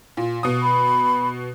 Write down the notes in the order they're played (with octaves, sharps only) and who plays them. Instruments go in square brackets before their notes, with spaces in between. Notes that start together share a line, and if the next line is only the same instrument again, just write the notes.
[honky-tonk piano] A#2
B2 D#6
[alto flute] B5